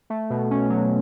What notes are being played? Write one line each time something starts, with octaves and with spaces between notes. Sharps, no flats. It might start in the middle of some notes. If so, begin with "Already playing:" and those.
A3
B2
C#4
F#3